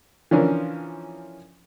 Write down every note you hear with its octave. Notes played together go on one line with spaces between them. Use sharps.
E3 F3 C#4 D4 A#4